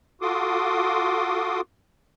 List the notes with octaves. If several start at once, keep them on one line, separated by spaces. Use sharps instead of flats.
F4 F#4 A4 C6 D6 D#6